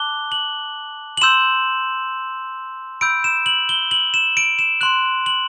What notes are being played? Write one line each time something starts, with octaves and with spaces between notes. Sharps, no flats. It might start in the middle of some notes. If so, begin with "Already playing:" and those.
Already playing: A5 D6 F#6 G7
F#7
F#7
C6 E6 G6 E7
B5 E6 G6 D7
E7
F#7
G7
F#7
E7
D7
E7
C6 F#6 F#7
F#7